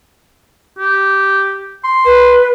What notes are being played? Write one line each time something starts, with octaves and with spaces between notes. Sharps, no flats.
G4
C6
B4